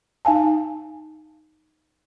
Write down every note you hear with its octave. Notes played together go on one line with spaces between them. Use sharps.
D#4 F5 G#5 A5